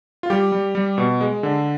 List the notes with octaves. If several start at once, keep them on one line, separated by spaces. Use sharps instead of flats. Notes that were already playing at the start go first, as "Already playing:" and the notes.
F4
G3 G4
G3
G3
B2
G#3
D3